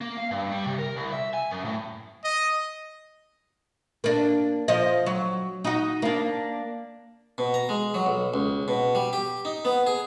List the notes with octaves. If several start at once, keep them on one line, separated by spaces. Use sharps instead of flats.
A#3
F5
G2
G3
C3
A#4
C2
E5
G#5
F#2
A2
D#5
A#3 D4
F3 D#5
F#3
D#4 F#4
A#3 D4
B2
A#5
G#3
F#3
B1
C#2
B2
G3
G4
D#4
B3
G#4